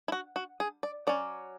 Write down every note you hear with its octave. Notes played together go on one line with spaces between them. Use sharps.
E4
F#4
F#4
G#4
D5
F#3 C#4 D5